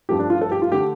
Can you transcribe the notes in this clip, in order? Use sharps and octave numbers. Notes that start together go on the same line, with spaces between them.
G2 F3 A3 G4
D4
F4
A4
G4
F4
D3 A3 G4